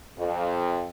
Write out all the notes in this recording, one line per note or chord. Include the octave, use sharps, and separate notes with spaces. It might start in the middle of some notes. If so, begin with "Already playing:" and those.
F2